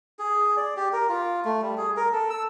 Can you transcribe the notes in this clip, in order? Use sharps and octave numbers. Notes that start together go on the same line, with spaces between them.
G#4
D5
G4
A#4
F4
A3
G3
G#4
A#4
A4
E6